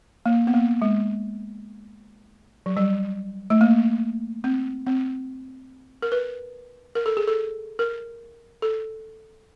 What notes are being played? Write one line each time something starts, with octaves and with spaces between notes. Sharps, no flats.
A#3
B3
A#3
G#3
F#3
G3
A3
A#3
C4
C4
A#4
B4
A#4
A4
G#4
A4
A#4
A4